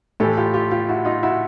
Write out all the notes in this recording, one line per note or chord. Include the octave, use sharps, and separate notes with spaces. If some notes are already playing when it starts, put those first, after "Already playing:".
A2 E3 G4 A4
F4 G4
F4 G4
F4 G4
E4 F#4
D#4 F4
E4 F#4